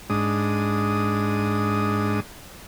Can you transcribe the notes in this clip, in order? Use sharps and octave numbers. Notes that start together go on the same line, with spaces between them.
G#2 G#3 D4 D#6